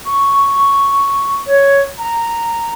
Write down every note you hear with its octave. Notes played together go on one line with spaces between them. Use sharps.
C#6
C#5
A#5